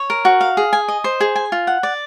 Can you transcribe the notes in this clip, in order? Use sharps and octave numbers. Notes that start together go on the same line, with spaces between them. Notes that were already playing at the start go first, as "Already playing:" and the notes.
Already playing: C#5
A#4
F#4
F5
G#4
G#5
D#5
C5
G#4
G#5
F4
F#5
D5